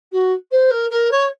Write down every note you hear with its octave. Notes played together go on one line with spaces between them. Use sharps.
F#4
C5
A#4
A#4
C#5